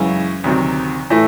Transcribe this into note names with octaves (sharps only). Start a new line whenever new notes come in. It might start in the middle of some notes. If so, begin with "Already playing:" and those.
Already playing: F#2 C#3 E3 G#3
D2 C3 D#3 F#3
A2 E3 A3